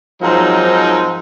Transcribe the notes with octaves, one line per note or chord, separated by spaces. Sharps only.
G#2 F3 F#3 C4 D#4 A#4